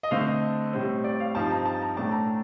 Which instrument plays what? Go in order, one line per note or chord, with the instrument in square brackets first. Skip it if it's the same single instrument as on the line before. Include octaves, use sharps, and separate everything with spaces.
[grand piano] D#5
D3 A3 C4 F5
D#5
A2 G3 C4
D5
F5
G2 F3 C4 D#4 A5
A#5
A5
A#5
A2 A3 D4 A5
A#5
A5